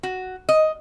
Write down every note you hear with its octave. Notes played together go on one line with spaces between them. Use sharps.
F#4
D#5